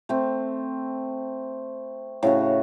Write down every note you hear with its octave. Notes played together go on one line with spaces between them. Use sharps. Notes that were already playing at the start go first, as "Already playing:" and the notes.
A3 C4
A2 C#3 F#4